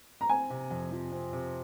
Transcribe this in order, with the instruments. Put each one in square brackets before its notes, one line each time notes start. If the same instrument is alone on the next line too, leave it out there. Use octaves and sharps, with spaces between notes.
[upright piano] A#5
[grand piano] C4 [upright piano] G#5
[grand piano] C3
F2
F3
C4
C3